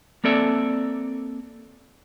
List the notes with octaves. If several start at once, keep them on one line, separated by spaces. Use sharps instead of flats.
A#3 C4 A4 D5 E5